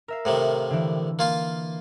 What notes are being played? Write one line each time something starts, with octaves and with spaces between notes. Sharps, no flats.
A#4 E5 F5
A2 C3 D#3
D3 E3
A#3 F4 F5